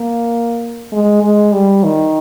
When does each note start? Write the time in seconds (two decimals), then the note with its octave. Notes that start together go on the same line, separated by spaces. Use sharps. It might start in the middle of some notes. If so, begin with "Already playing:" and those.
Already playing: A#3
0.92 G#3
1.23 G#3
1.53 G3
1.84 D#3